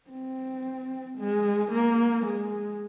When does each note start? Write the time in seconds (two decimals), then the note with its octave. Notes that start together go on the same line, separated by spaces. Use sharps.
0.10 C4
1.19 G#3
1.72 A#3
2.26 G#3